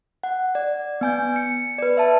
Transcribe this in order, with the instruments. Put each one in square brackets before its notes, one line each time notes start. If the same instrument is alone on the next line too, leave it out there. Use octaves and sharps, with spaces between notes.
[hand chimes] F#5
D5
B3 G#5 G6
C#7
B4 D5
E5 A5